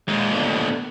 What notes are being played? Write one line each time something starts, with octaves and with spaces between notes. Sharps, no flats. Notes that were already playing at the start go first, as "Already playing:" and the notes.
D#2 A#2 G#3
A3 B3 D4